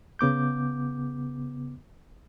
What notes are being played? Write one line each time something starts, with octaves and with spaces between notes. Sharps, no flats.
C#3 B3 D6 G6